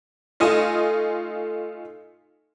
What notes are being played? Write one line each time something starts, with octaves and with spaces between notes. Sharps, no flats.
A3 D#4 F4 D#5 G#5 D#6